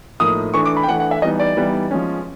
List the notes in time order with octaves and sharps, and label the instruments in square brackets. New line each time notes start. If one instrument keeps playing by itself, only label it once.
[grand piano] A2 F3 A#3 D#4 D#6
E3 A3 D4 C#6
D6
B5
G5
E3 A3 D4 F#5
F#5
E5
E3 G3 B3 D#4 D#5
D5
E3 G3 B3 D#4
F3 G#3 C#4